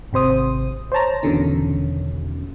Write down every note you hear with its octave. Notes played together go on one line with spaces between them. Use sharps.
G#1 C3 C5 D#6
C5 C#5 A5 A#5
E2 B2 D3 D#3 C#4